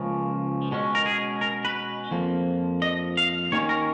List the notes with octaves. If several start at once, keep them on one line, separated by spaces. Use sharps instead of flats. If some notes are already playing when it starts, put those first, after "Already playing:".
Already playing: C#2 C#3 F3 A#3
B2 G#3 C#4
A#4
G#4
A#4
B4
F2 F3 A#3
D#5
F5
D#2 D#3 A#3 C#4 C#5
A#4